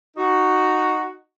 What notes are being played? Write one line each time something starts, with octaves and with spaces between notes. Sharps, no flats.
D#4 F#4